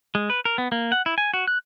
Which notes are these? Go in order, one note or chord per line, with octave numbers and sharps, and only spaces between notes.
G#3
B4
A#4
B3
A#3
F#5
E4
G#5
F#4
F#6